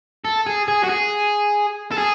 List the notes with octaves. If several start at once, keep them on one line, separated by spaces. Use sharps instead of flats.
A4
G#4
G#4
F#4
G#4
A4
G#4